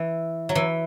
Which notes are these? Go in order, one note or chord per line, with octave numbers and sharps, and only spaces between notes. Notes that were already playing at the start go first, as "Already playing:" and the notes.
Already playing: E3
F#3
E3